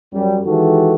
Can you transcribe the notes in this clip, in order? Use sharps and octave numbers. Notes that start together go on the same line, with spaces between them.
F#2 G3
D#3 E3 G#3 F#4 G4 A4